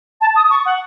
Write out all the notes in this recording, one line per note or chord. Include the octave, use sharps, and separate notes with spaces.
A5
D#6
C#6
F#5